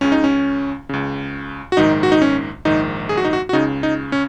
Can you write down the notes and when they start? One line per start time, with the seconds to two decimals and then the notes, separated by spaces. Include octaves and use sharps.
0.01 C#2 C#3 C#4
0.12 D#4
0.24 C#4
0.89 C#2 C#3
1.72 F#4
1.77 A#1 G#2 D#3 D#4
2.03 F#4
2.12 D#4
2.22 C#4
2.65 A#1 G#2 D#3 D#4
3.09 G#4
3.17 F#4
3.25 D#4
3.33 F#4
3.49 F#4
3.53 C#2 C#3 D#4
3.83 D#4
4.12 C#4